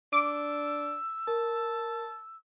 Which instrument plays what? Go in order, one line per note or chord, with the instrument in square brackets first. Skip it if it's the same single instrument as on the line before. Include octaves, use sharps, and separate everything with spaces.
[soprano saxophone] D4 [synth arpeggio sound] D6 [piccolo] E6
[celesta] A#4 [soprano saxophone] A5